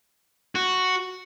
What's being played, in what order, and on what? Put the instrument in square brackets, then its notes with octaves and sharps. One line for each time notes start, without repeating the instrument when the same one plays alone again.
[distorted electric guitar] F#4